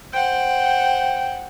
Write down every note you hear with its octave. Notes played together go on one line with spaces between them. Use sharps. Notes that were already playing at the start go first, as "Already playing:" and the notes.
C5 F#5 G5